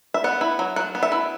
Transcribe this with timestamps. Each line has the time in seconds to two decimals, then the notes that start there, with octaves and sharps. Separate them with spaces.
0.14 E5
0.24 B3 F#5
0.41 E4
0.59 F#3
0.76 F#3 F#5
0.95 B3
1.03 E5
1.12 E4